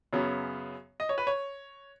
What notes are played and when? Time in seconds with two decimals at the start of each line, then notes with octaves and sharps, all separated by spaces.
0.13 F#2 C#3 F#3 B3
1.00 D#5
1.09 C#5
1.18 B4
1.27 C#5